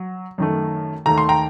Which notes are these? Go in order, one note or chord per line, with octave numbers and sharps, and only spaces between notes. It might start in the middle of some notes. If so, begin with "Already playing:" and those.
Already playing: F#3
F#2 D#3 A3
D#2 D#3 A3 A#5
C6
G5 A#5